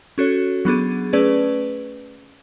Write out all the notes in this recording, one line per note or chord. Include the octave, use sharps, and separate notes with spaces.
C#4 F#4 A4 C#5
F#3 B3 D4 G#4
A3 C#4 G#4 B4 D5